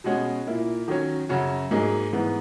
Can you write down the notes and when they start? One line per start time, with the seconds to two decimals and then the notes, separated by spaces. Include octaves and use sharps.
0.04 B2 G#3 C#4 F#4
0.47 A#2 A#3 E4
0.88 D#3 F#3 C#4
1.29 F#2 C#3 F#3 C#4 F#4
1.71 G#2 F#3 A#3 D#4 G#4
2.13 G#2 E3 B3